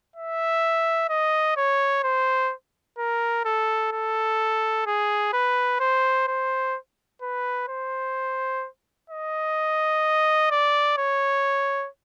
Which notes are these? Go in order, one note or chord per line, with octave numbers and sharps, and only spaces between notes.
E5
D#5
C#5
C5
A#4
A4
A4
G#4
B4
C5
C5
B4
C5
D#5
D5
C#5